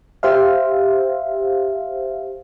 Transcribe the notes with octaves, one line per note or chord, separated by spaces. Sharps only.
G4 C5 E5 F5